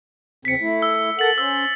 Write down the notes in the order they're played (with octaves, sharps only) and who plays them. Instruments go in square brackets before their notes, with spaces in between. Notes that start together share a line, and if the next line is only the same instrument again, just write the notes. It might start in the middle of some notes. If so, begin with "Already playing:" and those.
[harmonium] E2 C#3 C4 [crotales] B6 C#7
[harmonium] A3 E4
[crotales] E6
[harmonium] A4 A#4 F#5 [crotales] A6 F#7
[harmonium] C#4 C5 [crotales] E6